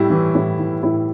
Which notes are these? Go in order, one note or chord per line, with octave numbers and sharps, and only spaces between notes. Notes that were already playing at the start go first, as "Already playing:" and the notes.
Already playing: A2 G3 E4
E3
A2
E3
A2 E4